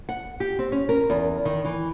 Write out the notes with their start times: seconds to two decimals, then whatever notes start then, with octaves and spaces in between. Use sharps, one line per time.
0.09 F#5
0.40 G4
0.59 C4
0.72 C#4
0.89 A#4
1.10 E2
1.45 D#3
1.65 E3